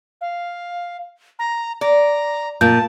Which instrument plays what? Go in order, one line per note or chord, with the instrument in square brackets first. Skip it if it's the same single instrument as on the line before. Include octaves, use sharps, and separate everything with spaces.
[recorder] F5
A#5
[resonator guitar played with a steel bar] D5 [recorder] A#5
[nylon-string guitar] A#2 [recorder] A5 [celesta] G6